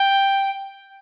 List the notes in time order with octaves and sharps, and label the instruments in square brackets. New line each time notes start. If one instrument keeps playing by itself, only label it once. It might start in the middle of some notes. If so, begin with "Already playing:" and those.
Already playing: [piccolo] G5